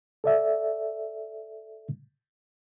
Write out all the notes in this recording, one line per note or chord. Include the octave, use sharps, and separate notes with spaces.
A4 D5 E5